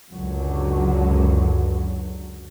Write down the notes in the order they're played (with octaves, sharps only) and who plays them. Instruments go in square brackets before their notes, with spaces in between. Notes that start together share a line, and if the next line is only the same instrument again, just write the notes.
[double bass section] C#2 F#2 D3 F#3